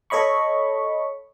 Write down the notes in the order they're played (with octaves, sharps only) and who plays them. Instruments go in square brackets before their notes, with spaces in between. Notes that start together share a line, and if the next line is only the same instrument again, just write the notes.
[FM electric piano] A4 C#5 D#5 B5 C#6